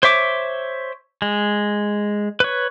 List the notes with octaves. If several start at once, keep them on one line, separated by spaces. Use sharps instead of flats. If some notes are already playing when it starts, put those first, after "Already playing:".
C5 C#5 E5 D6
G#3
B4 C#5